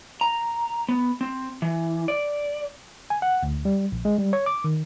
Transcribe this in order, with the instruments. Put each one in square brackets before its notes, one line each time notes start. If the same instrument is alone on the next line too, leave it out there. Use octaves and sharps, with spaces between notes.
[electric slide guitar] A#5
B3
C4
E3
D5
[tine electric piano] G#5
F#5
D2
G3
A#1
G#3
G3
C#5
D6
D#3